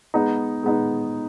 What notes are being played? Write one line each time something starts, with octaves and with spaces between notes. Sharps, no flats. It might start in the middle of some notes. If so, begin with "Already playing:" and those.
G#3 B3 D#4
G#3 B3 D#4